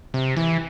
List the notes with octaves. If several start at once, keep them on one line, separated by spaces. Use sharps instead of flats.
C3
E3